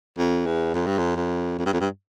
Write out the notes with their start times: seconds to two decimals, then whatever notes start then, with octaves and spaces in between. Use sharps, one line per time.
0.18 F2
0.46 E2
0.74 F2
0.86 G2
0.98 F2
1.16 F2
1.58 F2
1.66 G2
1.73 F2
1.81 G2